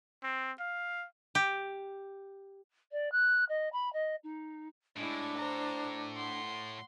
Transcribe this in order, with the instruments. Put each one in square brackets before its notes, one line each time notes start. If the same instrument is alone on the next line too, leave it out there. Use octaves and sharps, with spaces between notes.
[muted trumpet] C4
F5
[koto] G4
[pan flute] D5
F#6
D#5
B5
D#5
D#4
[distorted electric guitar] A2 [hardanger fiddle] G#3 E4 [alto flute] D4
[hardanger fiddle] C5 A#5
F#5 C6